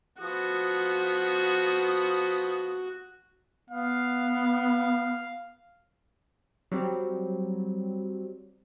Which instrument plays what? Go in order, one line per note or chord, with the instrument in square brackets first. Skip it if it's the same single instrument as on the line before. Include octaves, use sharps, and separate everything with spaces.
[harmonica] F3 B3 D#6 [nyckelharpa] F#4
[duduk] B3 [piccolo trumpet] F5
[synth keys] F#3 G3 C4